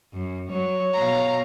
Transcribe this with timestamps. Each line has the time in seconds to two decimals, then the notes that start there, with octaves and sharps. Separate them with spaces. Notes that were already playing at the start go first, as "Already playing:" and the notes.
0.12 F#2
0.50 F#3 C#5
0.94 B2 F5 A#5